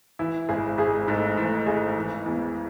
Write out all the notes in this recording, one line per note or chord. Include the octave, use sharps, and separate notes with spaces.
E3 E4
G#1 G#3 G#4
G#1 G#3 G#4
G#2 A3 A4
E3 A3 A4
G#1 G#3 G#4
E3
E2